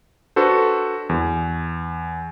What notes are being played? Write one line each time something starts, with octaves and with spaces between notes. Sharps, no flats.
D4 F#4 A4 B4 C5
E2